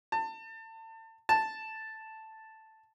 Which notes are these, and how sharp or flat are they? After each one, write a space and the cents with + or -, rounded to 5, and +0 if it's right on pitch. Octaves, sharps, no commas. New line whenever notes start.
A5 +30
A5 +0